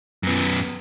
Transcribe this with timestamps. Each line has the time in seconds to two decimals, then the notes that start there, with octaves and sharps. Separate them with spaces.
0.23 F#2 B3